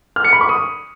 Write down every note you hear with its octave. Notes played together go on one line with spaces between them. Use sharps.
F6
C#7
B5
C#6
D#6